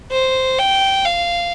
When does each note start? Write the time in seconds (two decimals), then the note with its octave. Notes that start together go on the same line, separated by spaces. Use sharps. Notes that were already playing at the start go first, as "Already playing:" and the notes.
0.12 C5
0.59 G5
1.05 F5